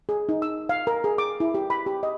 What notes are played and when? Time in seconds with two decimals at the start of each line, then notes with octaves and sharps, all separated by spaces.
0.09 G#4
0.29 D#4
0.42 E6
0.69 F5
0.87 A#4
1.04 G#4
1.18 D6
1.40 E4
1.55 G4
1.70 B5
1.86 G4
2.03 D#5